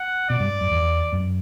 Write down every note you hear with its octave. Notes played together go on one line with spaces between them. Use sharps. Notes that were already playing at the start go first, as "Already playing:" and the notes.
Already playing: F#5
B2 D5
G2
F#2
E2
F#2